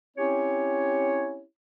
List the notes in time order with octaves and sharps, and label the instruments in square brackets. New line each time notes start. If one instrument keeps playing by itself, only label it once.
[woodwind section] C4 C#4 E4 G4 C#5